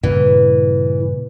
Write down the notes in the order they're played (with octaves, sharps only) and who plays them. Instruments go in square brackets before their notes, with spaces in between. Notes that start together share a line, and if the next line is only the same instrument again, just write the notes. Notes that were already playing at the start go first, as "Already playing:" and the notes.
[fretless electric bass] G2 A#2 C#3 [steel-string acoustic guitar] E3